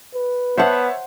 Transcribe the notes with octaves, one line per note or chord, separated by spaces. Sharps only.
B4
B3 C5 C#5 E5 F#5 A5